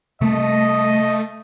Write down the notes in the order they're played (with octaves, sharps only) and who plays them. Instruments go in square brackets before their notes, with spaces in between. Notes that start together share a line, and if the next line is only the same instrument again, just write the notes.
[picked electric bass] C3 G3 A#3 [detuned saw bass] A3 [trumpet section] D#5